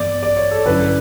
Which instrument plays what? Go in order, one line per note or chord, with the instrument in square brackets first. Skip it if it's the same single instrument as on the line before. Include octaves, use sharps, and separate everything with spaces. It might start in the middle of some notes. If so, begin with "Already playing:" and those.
Already playing: [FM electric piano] G2 E3 B3 [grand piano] D5
[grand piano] D5
C#5
A4
[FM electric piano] G2 D3 F#3 C#4 E4 [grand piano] B4